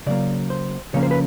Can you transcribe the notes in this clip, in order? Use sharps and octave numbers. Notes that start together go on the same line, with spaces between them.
C#3 F#3 A#3 D5
C5
C#3 F3 A#3 C#4 C#5
C5
B4